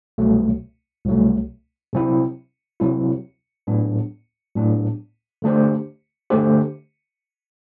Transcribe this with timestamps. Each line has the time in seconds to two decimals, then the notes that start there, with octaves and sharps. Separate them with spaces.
0.18 C2 B2 F#3 A3
1.06 C2 B2 F#3 A3
1.93 C3 F#3 C4 E4
2.80 C3 F#3 C4 E4
3.67 A2 F#3 B3 D4
4.55 A2 F#3 B3 D4
5.42 D3 A3 D4 G4 C5
6.30 D3 A3 D4 G4 C5